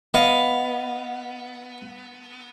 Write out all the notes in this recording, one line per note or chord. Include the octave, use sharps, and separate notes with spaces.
B3 D#5 F5